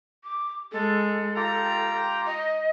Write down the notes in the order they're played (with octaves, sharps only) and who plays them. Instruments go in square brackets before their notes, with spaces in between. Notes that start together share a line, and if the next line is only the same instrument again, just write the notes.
[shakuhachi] D6
[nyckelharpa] G#3 [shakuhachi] A4
[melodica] F4 G4 G5 [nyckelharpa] A#5
[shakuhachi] D#5